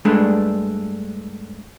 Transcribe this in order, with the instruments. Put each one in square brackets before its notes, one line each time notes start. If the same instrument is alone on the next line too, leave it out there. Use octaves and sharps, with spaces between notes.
[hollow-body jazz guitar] G2 G#3 A3 D4